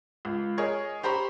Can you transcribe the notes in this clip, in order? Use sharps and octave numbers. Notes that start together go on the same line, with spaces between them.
C#2
G#4 A#4 C#5 D#5 G#5
G4 C5 A#5 B5 C#6